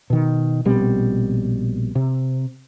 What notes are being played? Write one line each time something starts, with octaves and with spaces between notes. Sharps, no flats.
B2 D#3
A#1 B2 G3 C4
C3